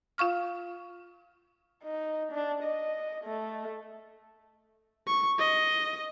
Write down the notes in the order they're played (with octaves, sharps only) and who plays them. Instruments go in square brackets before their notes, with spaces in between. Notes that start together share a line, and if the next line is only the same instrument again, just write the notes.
[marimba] F4 F5 C#6 F6
[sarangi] D#4
D4
D#5
A3
[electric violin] C#6
D#5